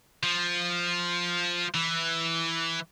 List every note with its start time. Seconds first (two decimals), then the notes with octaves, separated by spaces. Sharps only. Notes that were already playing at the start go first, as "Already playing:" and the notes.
0.23 F3
1.75 E3